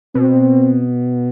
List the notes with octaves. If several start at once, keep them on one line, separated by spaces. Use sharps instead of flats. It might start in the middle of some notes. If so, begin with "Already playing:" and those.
B2 C4